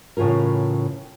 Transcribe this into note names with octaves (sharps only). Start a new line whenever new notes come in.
A2 C#3 E3 F4 A#4